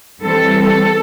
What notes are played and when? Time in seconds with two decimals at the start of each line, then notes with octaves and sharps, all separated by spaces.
0.21 E3 G3 C4 A4
0.62 A4